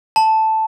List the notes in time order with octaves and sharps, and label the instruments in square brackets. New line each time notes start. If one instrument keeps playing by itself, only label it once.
[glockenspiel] A5